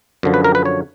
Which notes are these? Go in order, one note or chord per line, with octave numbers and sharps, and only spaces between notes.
F#2 D3 F3
B4
A#4
B4
C#5